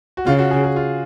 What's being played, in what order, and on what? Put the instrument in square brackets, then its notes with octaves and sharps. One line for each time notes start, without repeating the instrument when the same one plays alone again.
[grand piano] F#4
[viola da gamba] C#3 [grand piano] F4
[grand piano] F#4
G#4
G#4
F4